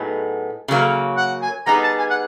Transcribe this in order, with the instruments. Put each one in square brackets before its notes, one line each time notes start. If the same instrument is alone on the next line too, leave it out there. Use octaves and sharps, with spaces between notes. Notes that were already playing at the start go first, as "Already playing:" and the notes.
Already playing: [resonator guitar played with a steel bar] A2 F#3 B3 D#4 G#4
C#3 F#3 A#3
[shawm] F#5
G#5
[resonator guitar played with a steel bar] G3 B3 D#4 G#4 [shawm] A#5
[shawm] A5
G#5
F#5